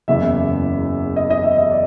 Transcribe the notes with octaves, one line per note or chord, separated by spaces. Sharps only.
F#1 E2 C#3 E5
D#5
D#5
E5
D#5
D5